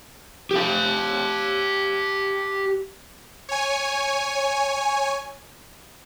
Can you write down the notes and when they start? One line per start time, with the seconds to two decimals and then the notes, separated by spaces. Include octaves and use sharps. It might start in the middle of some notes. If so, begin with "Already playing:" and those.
0.51 G4 F5
3.49 C#5 G#5